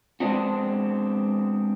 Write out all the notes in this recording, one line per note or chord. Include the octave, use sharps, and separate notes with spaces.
G#3 B3 C4 D4 F#4